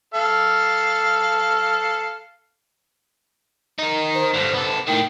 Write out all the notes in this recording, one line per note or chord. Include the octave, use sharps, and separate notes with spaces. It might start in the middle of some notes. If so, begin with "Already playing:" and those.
A4 F5
D#4 A#4
C5
G2 D3
B3 A4
A2 D#3 G5